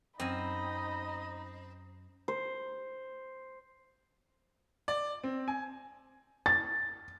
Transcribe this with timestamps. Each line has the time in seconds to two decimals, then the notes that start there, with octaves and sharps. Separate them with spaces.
0.20 F#2 C4 D#4 D#5 G#5 B5
2.28 C5
4.88 D5
5.24 C4
5.48 G#5
6.46 A6